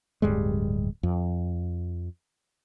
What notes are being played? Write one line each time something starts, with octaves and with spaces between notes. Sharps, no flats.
D1 G2 G3 G#3
F2